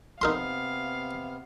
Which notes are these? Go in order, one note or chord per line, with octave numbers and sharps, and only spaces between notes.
C3 B3 D#4 A#4 F5 C6